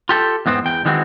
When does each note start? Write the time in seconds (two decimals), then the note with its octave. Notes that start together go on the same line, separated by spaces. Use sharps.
0.09 F4 G4 A4
0.46 E2 G#2 B3 C4
0.66 E2 G5
0.85 D#3 E3 G#3 C4 F#4